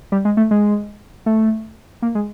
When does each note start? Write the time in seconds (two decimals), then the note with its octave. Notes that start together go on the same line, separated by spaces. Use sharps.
0.12 G3
0.25 G#3
0.37 A3
0.51 G#3
1.26 A3
2.02 A#3
2.15 G#3